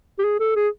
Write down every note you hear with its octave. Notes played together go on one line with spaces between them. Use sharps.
G4
G#4
A4
G#4